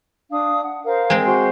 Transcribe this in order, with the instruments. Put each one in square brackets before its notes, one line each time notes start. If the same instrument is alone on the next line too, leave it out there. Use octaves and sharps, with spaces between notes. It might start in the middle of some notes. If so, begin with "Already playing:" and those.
[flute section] D4 F5 D#6
F#5
A#4 C5 F5
[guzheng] G#3 C4
[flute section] F#4 C5 C6